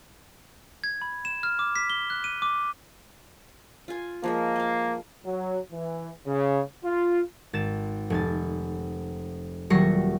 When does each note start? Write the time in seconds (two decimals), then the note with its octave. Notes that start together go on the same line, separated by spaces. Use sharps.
0.84 G#6
1.02 B5
1.25 E7
1.43 F6
1.59 D6
1.76 B6
1.90 G7
2.10 F#6
2.24 D#7
2.42 D6
3.88 F4 G#5
4.24 F3 G#3 A#3 A#4
4.56 D#5 F5
5.26 F#3
5.71 E3
6.26 C#3
6.84 F4
7.53 G#1 A6 E7
8.10 F1 G#5 A6
9.70 D#1 F#3 G3 C#6 A#6 C7